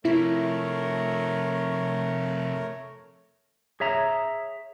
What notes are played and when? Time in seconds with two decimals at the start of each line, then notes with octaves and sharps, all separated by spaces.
0.05 C3 F3 A3 E4 A#4 C#5
3.80 G#4 C#5 E5 A#5